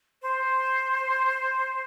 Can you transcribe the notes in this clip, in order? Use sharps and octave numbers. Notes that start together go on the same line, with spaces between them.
C5